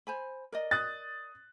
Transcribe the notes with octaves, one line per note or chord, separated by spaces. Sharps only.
C5 G#5 B5
A#4 D5 D#5
D#6 F#6 A6